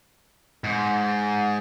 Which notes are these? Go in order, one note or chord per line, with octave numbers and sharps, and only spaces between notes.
G#2